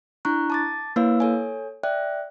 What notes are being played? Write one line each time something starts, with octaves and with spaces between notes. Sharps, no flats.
D4 E4 A#5 C#6 F#6
A5 D6 A6
A#3 E4 B4 C#5 F5 E6
A4 C#5 G#5
D5 E5 G5 F#6